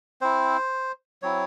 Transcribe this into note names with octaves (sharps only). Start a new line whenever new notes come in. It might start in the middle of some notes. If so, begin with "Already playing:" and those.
C4 E4 C5
F#3 C4 E4 C#5